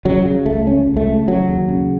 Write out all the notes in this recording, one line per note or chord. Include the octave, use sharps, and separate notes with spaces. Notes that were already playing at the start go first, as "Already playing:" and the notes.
C#3 F#3
C#3
C#2 A3
C#2 C#4
C#2
A3
C#3
C#3 F#3
D#2
C#3